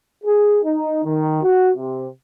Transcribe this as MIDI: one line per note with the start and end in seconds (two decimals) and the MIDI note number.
0.24 0.58 68
0.64 1.03 63
1.04 1.39 51
1.42 1.71 66
1.77 2.06 48